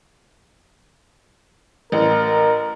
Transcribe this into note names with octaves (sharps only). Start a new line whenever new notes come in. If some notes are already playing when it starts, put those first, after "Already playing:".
A1 A#4